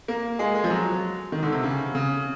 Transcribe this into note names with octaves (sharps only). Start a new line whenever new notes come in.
A#3
G#3
G#3
F3
F#3
D#3
D3
C3
C#3
C#3